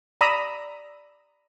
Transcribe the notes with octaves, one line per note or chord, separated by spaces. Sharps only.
D5 A#5 B5 D#6 E6